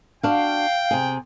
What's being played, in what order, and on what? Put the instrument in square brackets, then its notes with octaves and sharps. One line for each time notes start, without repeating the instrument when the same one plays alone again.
[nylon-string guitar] D4 F#4 [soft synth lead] F5 [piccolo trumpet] G5
[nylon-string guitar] C3 G#4